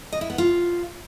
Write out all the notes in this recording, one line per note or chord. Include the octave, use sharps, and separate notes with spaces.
D#5
E4
B3
F4